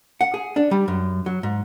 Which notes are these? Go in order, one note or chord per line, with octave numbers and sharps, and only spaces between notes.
F#5
G#4
D4
G3
F#2
F#3
G#2